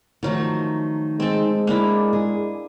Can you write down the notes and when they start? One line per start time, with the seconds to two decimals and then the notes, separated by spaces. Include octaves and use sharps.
0.23 D#3 F3 F#3 A3
1.20 G#3 C4 A4
1.67 A#3 D4 E4
2.13 G#4